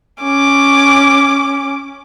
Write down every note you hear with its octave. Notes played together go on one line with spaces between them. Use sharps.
C#4 D6